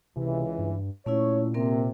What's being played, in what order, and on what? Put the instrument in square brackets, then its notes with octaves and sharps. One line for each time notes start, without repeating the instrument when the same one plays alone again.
[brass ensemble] C#2 E3 [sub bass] C3
[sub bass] G2
[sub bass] A#2 [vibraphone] A3 C#4 E4 [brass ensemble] C#5
[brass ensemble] C3 [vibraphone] A#3 C4 A#4